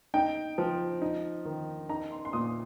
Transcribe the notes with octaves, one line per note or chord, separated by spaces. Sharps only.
D#4 G5
F3
D#4
D#3
D#4 A#5
C6
C6
A#2 D#6